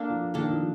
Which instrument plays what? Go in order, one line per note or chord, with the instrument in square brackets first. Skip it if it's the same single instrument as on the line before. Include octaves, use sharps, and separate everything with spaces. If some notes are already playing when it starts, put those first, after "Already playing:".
Already playing: [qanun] A#3 D4 A4
[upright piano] F3
[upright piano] D#3 [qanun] A#3 D4 A4
[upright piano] F3